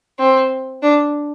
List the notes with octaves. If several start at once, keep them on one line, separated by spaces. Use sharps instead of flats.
C4
D4